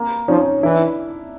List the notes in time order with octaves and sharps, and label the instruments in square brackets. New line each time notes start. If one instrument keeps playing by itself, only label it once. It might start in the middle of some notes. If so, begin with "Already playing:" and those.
Already playing: [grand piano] A#3
[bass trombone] F3 [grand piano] C#4 D#4
[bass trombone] E3 [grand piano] D4 E4